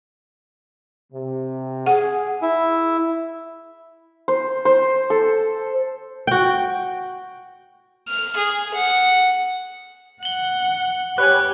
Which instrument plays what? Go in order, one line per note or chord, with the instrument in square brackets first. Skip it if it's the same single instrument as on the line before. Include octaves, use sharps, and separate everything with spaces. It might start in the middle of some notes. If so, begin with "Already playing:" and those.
[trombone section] C3
[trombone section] G#4 [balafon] F#5
[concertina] E4
[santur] C5
C5
A4
[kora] F#4 G5
[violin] F6
G#4
F#5
[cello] F#5 [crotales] F#7 G7
[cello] G4 [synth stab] B4 C#5 G#5 [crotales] F#6